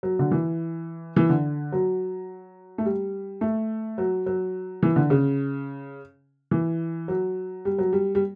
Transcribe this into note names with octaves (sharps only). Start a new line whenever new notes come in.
F#3
D3
E3
E3
D3
F#3
A3
G3
A3
F#3
F#3
E3
D3
C#3
E3
F#3
G3
F#3
G3
G3